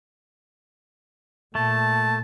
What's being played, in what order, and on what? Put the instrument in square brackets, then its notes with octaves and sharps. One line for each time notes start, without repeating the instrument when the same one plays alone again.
[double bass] A#2 [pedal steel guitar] A3 [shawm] A5